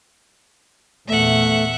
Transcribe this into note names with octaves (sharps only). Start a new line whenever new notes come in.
E2 A#2 A3 E5 F#5